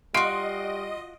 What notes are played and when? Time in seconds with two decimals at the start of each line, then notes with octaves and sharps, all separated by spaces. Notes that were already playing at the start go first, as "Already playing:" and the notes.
0.14 G3 F4 F#4 D#5 C6 C7 D7